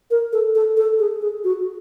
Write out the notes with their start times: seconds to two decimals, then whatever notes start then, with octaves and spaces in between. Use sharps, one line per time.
0.11 A#4
0.33 A4
0.55 A4
0.77 A4
0.99 G#4
1.22 G#4
1.44 F#4